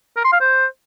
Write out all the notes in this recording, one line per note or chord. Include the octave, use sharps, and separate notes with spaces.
A#4
C6
F5
C5